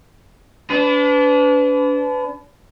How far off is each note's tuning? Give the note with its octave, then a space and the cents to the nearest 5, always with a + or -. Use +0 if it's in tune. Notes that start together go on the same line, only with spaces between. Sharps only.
D4 -35 B4 +30